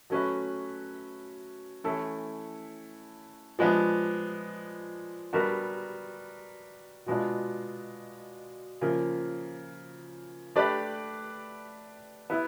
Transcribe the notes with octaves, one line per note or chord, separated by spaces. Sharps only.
F#3 A3 C#4 F#4 B4
E3 A3 C#4 E4 A4
F3 G#3 B3 D4
G3 B3 D4 F#4 A#4
B2 G#3 B3 D4 F4
C#3 F3 A#3
A3 D4 G4 B4 D5
B3 E4